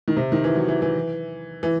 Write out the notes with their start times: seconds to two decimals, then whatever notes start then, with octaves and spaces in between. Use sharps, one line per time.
0.08 D#3
0.16 C3
0.32 D#3
0.44 E3
0.56 F#3
0.68 E3
0.82 E3
1.63 E3